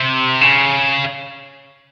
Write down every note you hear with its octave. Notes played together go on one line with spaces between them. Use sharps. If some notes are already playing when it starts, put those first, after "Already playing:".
Already playing: C3
C#3